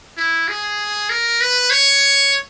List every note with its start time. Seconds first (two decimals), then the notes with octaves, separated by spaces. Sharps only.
0.17 E4
0.48 G#4
1.10 A#4
1.41 B4
1.70 C#5